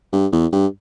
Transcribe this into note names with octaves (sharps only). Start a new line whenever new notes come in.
G2
E2
G2